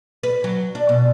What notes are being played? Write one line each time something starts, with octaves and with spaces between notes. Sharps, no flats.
B4
F#3
D4
B2